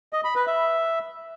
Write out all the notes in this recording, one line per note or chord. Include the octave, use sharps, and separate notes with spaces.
D#5
B5
B4
E5